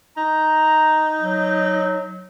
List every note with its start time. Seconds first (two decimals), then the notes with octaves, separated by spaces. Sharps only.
0.17 D#4 A#5
1.21 F#3